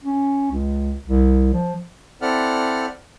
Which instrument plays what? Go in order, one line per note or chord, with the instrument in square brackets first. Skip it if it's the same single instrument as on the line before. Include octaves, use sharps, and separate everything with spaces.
[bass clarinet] C#4
C#2
C2
F3
[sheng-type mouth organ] C4 E4 A4 D5 F#5 F6